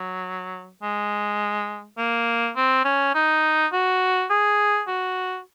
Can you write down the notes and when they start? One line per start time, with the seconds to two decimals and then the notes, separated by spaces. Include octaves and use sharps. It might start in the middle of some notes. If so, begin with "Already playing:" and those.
Already playing: F#3
0.83 G#3
1.98 A#3
2.56 C4
2.85 C#4
3.15 D#4
3.73 F#4
4.30 G#4
4.88 F#4